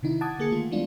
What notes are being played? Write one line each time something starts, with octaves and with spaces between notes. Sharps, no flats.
C3 D#3 D#4 E4
F#5 A5 D6 D#6 G#6
D3 A#3 G#4 C#7
D#3 A3 F4
E3 G3 G#3 B3 D4 F4